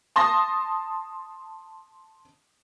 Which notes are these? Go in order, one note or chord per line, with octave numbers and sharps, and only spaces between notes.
A5 C6 D#6 A#6